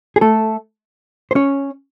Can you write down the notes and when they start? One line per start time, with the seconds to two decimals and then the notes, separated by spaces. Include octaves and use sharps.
0.16 G#4
0.21 A3 A4
1.31 C5
1.35 C#4 C#5